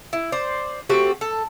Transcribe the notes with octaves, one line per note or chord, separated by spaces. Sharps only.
E4
C5 D5
A3 C4 F#4 G4
A4